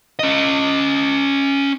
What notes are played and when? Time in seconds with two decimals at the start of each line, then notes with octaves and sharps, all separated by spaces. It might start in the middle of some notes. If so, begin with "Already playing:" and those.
0.19 C#4 D#5